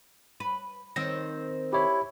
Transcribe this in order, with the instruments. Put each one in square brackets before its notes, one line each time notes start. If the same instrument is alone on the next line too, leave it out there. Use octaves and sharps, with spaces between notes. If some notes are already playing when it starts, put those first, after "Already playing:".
[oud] B4
[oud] D#3 C4 [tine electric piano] A#6
[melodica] E4 [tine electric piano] G4 C#5 B5